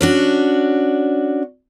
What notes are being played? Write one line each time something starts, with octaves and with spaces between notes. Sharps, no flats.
C#4 D4 F#4